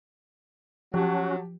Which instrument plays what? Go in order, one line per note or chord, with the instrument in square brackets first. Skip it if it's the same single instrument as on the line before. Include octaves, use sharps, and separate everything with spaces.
[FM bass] F3 [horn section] F#3 A5 [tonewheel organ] C#4 F#4 [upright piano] G4